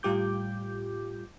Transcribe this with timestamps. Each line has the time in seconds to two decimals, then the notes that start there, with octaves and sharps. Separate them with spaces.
0.03 A2 G3 F4 G4 D6 G6